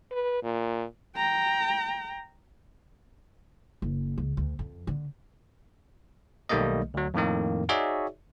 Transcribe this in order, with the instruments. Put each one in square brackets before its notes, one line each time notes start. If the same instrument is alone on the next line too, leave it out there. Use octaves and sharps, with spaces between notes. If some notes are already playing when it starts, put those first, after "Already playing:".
[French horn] B4
A#2
[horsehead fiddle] G5 A#5
[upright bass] F#1
C#2
D2
F2
D3
[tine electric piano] B1 D#3 G3 A3 A#3 D#5
D2 F#3
F2 A2 D#3 A#3
D#4 F#4 G#4 C#5 D5 E5